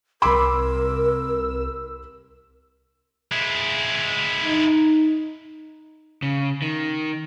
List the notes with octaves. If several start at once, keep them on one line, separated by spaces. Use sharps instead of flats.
C2 A#4 B5 C6 D6 E6
G#3 E4
D#4
C#3
D#3